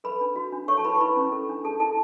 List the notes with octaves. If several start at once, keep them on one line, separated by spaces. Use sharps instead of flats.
A4 B4 B5
D4
F#4
D4
A4 C#5 C#6
A5
E4 B4 B5
C#6
E4 B4 B5
C#4
A4
D4
G#4 A4 A5
E4 A4 A5